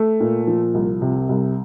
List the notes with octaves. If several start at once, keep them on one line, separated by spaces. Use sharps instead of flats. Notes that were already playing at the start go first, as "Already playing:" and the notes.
Already playing: A3
A#2
F3
C2
C3
C2